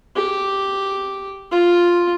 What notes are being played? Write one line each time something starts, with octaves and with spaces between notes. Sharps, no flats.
G4
F4